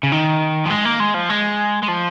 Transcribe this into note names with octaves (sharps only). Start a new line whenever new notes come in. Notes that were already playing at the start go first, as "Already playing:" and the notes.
C#3
D#3
F3
G#3
A#3
G#3
F3
G#3
G#3
F3